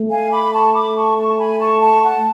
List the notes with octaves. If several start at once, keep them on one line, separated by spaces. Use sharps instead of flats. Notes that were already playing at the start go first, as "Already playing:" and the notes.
Already playing: A3
F5 G#5
B5 D6
A5 C#6
B5 D6
A5 C#6
A5 C#6
A5
G#5 B5
A5 C#6
A5 C#6
F#5 A5